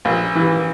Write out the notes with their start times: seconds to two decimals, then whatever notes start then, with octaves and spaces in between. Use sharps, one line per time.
0.05 A#1
0.35 E3